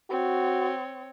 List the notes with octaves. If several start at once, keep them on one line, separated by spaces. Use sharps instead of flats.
C4 F#4 C#5